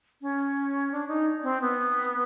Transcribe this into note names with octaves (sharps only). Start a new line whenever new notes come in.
C#4
D4
D#4
C4
B3